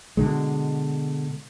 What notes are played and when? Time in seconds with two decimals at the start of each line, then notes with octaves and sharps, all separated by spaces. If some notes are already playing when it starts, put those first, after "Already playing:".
0.17 B2 D3 G#3